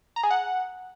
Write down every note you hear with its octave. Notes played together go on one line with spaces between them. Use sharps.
A#5
G#4
F#5